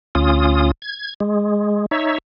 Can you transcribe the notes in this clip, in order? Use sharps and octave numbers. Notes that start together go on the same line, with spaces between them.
D2 C#4 F4 D#6
G#6
G#3
D#4 C#5 E5